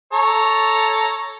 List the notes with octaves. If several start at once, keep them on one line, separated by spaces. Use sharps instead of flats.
A4 C#5 A#5